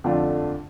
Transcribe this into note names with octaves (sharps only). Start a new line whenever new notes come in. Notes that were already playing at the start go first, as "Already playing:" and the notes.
F2 D3 A3 D4 F4